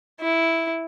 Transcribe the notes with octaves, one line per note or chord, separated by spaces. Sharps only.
E4